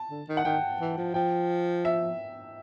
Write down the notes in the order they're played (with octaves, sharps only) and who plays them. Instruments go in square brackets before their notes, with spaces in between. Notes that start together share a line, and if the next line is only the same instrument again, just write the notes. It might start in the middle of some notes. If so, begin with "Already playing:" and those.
Already playing: [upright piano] A5
[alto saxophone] D3
D#3
[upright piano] F#5
[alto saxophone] D#3 [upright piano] G5
[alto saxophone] E3
F3
[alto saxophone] F3 [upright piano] G5
[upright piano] E5